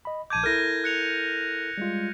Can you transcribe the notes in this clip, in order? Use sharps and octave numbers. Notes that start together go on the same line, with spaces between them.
D#5 B5
A#1 A5 D6 G6 G#6 D#7
E4 A4 A#4 F6 A#6
F#6 C#7 F7
G3 G#3 F4